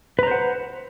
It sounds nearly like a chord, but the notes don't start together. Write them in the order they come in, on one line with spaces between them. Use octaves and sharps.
B4 A#5 C5 F#5